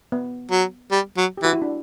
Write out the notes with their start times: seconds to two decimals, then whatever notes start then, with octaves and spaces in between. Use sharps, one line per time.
0.12 B3
0.51 F#3
0.91 G3
1.17 F#3
1.37 G4
1.43 E3 F#4
1.53 E4
1.62 D4